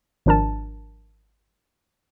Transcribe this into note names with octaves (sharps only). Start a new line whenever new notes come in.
G#1 F3 D4 A#4 A5